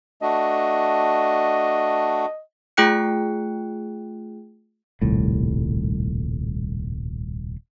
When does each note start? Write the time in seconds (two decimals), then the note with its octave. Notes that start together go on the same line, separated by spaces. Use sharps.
0.22 A3 D4 F#4 D#5
2.77 A3 F4 G#4 G5 F#6 C#7
5.02 D#1 C2 A2